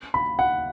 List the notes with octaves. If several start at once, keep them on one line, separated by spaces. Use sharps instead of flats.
B5
F#5